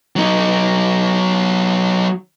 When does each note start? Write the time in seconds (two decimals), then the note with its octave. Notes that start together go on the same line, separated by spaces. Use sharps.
0.16 F#3 D#4